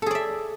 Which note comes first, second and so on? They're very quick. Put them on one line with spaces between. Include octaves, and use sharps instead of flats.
A4 G#4 D5 E5